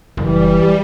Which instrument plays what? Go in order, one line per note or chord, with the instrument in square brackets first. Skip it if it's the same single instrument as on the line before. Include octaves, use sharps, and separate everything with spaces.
[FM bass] F#1 [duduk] E3 [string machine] G3